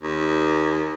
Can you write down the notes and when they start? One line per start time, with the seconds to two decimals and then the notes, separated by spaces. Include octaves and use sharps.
0.02 D#2